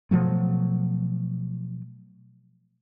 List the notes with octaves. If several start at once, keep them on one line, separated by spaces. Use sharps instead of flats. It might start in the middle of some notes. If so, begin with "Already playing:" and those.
B2 F3 F#3 A3